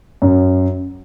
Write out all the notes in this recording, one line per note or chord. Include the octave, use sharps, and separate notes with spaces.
F#2